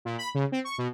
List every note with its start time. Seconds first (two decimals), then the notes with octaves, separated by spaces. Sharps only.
0.05 A#2
0.18 B5
0.35 C#3
0.52 C4
0.64 C#6
0.78 B2